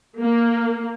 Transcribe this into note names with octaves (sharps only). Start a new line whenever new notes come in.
A#3